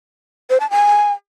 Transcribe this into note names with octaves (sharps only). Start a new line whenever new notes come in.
C5
A5
G#5